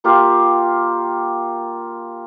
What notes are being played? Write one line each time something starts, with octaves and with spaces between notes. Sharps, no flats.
A#3 F4 G4 F5